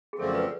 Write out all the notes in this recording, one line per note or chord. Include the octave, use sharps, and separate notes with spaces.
G#4
F#2 D3 F3 A3 C4 A4
B4